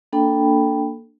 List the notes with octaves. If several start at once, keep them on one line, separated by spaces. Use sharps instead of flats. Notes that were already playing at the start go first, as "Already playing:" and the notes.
A#3 D4 A4 G5 B5